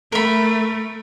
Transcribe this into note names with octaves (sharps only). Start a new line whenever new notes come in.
A3 A#4 B5